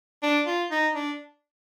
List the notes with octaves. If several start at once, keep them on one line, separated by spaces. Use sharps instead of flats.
D4
F4
D#4
D4